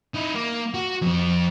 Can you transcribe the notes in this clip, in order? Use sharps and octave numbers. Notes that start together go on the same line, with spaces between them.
D#4 E4
A#3
F#4
F2 C4